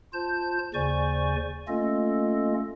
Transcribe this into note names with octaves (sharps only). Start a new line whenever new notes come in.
F4 C5 A5 G6
D#2 C#3 C5 D5 G#5 C#6
A3 A#3 C#4 F4 A4 D#5